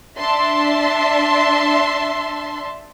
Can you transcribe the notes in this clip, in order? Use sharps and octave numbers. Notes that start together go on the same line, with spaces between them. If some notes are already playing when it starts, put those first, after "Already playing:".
D4 E5 A5 C6